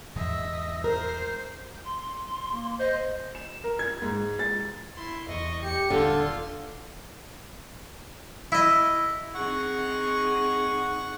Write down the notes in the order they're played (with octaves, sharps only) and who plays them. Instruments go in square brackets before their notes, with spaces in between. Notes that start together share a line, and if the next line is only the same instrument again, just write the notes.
[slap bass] E2 G#2 G#3 [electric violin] D#5 E5
[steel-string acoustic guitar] A#4 [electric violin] C5
[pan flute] C6
[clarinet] A#3
[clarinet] C5 [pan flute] D#5
[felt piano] E7
A#4
G#6
G#2
A6
[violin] E4 C6
[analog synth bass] E2 [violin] D#5 C#6
[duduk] G4 [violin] C#7
[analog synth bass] D#1 [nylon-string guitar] D3 [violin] F4 C6 [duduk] A4
[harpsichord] E4 D#5
[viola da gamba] C4 D#4 G#4 [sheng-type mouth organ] F#5 C#6